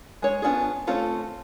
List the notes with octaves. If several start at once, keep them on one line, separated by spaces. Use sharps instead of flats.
G#3 C#5
B3 C#4 D4 F4 G#4
A3 C4 C#4 F4 A4